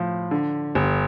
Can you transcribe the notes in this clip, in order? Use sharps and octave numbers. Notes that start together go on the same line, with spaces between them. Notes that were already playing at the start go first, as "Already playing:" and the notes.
Already playing: A2 F3
D3
G1